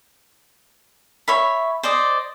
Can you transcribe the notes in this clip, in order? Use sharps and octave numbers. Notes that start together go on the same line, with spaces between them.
C#5 E5 B5
C5 D5 D#5